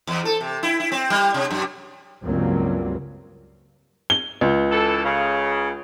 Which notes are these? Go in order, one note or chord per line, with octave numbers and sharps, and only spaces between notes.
E2
A4
C3
E4
E4
C4
G3
C3
F#2
C#2 G2 F#3 G3 A#3 C4
G7
C#2
E3 A4
C#3